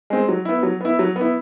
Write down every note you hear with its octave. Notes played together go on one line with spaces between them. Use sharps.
G#3 C4
F#3
B3 E4
F#3
B3 E4
F#3
B3
E4